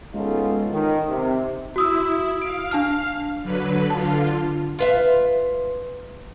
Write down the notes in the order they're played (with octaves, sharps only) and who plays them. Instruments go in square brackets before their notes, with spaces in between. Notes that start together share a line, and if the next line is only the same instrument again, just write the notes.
[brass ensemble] G#3 B3 C#4 D#4 F4 A4
D#3
C3
[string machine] E4 [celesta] F#4 D#6 E6
[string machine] F5 [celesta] D7
[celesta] D4 A5 F6
[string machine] D3 F#3 B4
[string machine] D3 F4 [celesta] A5
[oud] F4 B4 E5